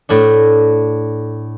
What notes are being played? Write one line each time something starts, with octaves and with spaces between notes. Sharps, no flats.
A2 D4